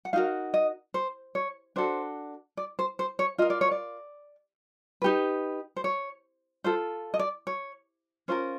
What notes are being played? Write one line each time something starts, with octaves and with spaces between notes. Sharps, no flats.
F#5
D#4 F#4 A#4 F5
D#5
C5
C#5
D4 F#4 A4 C5
D5
C5
C5
C#5
F4 A#4 D#5
D5
C#5
D5
D#4 G4 B4
C5
C#5
F4 A4 C5
D#5
D5
C#5
C#4 F4 A#4 C5